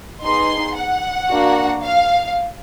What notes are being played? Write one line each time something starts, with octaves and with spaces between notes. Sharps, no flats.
B3 D#4 G#4 C6
F#5
A#3 D4 F#4
F5